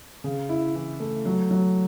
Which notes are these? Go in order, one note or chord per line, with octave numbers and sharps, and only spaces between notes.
C#3
E4
E3
A3
F#3
F#3